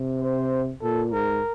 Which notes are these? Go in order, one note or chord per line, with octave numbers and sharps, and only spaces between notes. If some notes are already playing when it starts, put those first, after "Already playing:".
Already playing: C3
C5
A#2 A4
G#2 A#4